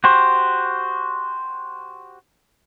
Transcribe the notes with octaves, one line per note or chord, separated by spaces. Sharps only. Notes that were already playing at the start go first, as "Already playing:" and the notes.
F#4 G4 C5